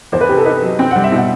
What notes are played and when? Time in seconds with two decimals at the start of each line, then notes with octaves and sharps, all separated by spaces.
0.12 E2 C5
0.21 B4
0.29 C3 G4
0.38 A4
0.45 D#4 B4
0.62 F#3
0.79 C4 G5
0.91 G3 F#5
1.04 E5
1.12 B2 F#5